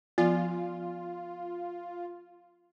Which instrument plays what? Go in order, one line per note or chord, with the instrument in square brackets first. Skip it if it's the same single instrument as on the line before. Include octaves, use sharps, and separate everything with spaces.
[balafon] F3 B3 [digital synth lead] F4